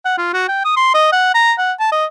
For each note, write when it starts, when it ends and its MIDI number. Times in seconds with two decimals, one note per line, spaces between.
0.05 0.14 78
0.18 0.31 65
0.33 0.46 66
0.48 0.64 79
0.64 0.73 87
0.76 0.91 84
0.94 1.07 75
1.12 1.34 78
1.34 1.53 82
1.58 1.72 78
1.80 1.90 81
1.92 2.05 75